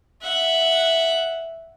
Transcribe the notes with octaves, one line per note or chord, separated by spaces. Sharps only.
E5 F#5